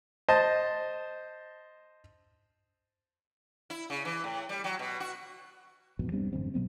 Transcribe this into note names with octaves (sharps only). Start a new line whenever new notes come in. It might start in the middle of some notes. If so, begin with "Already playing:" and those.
C5 D#5 A5
E4
C#3
E3
A2
G3
F#3
B2
F#4
A1 F2 G#2 B2
G3 B3 C4 D4
A1 F#2 D3 C4
B2 F#3 B3 C4